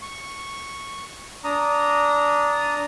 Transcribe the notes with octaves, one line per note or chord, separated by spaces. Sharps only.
C#6
D4 A#5 D#6